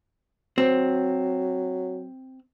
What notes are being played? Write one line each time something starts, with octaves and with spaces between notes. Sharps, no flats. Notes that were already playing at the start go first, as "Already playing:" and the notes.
F#3 C4